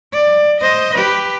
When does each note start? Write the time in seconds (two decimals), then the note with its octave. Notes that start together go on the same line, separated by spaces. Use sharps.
0.13 D5
0.61 C5 D#5
0.95 G4 B4